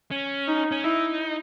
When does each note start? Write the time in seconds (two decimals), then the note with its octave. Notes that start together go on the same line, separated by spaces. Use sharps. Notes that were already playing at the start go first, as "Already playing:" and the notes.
0.11 C#4
0.47 D#4
0.71 C#4
0.84 D#4 E4